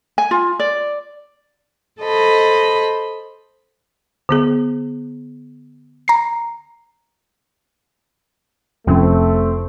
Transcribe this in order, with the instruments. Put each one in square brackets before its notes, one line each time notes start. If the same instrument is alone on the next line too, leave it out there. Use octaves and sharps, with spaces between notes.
[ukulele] G#5
F4
D5
[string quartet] A4 C5 D#5 B5
[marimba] D3 B3 G#4
[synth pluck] A#5 C7
[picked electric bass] F1 C#4 [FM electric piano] F3 [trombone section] A3 [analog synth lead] C4